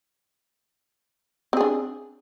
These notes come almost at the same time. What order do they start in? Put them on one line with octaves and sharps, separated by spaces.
C4 G#4 D4